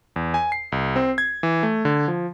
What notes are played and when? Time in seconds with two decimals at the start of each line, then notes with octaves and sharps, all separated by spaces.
0.16 E2
0.34 G#5
0.52 C7
0.72 C2
0.96 C4
1.18 G#6
1.43 E3
1.63 A3
1.85 D3
2.08 F3